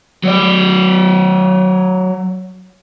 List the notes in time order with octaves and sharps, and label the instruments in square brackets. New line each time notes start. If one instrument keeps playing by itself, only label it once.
[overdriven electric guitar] F#3 D5